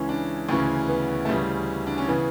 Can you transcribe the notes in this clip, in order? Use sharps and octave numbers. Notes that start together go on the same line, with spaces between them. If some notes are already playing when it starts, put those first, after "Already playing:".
Already playing: C#2 C#3 E3 C#4
D4
D2 C#3 E3 C#4
B3
A3
D2 C#3 E3 G3
D4
C#4
C#3 E3 B3